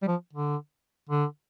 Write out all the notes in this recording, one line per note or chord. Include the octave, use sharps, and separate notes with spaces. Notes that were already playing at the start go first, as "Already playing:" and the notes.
G3
F3
D3
D3